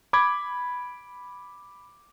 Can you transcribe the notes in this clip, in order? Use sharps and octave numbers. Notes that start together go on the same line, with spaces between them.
B5 D6 G#6